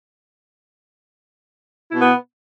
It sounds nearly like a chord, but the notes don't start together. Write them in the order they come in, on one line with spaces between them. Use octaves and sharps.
E4 B2 B3